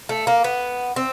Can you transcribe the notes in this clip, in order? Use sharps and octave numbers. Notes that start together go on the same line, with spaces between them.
A3
A#3
B3
C4